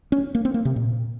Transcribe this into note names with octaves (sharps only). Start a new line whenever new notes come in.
C#4
A#3
C4
A#3
C3
A#2